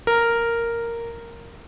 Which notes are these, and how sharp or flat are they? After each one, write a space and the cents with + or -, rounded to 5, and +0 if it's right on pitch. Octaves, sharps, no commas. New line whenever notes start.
A#4 -5